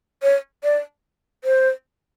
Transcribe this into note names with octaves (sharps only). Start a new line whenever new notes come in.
C#5
D5
C5